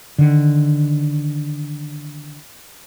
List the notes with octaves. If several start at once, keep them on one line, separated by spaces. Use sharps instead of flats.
D3 D#3